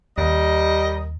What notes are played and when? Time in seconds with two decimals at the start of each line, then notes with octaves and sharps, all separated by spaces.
0.18 D#2 G3 A#4 D#5